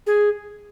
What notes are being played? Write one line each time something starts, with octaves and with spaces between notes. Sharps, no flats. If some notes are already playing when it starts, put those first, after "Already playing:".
G#4